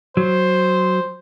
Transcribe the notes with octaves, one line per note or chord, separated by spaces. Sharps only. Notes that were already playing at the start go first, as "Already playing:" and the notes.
F#3 C5